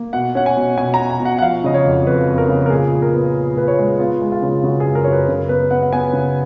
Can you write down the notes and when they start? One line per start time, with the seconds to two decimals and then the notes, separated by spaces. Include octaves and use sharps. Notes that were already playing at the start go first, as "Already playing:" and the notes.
Already playing: A#3
0.13 B2 F#5
0.35 C#4 F#5
0.46 G#5
0.57 B2
0.77 B2 G#5
0.94 A#5
0.99 B2
1.10 G#5
1.20 B2
1.25 F#5
1.38 F#5
1.42 F3 F5
1.64 C#3 D#5
1.74 C#5
1.85 F2
2.07 F2 B4
2.28 F2
2.38 A#4
2.49 C#3
2.66 A#4
2.70 A#2 G#4
2.93 A#2
3.02 A#4
3.14 B3
3.35 A#2
3.56 A#2 B4
3.68 C#5
3.78 G#3
3.99 B3 F4
4.21 G#3
4.32 F4
4.43 C#3
4.64 C#3 F#4
4.80 G#4
4.85 F#2
4.95 A#4
5.04 C#5
5.07 F#2
5.12 B4
5.29 C#3 A#4
5.49 B3 B4
5.71 B3 F#5
5.83 F#5
5.93 B3 G#5
6.13 C#3